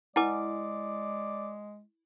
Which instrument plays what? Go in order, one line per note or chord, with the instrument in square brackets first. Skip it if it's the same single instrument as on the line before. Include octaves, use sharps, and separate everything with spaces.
[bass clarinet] G#3 [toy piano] E4 B4 [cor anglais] D5 [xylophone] F#5 G#5 D6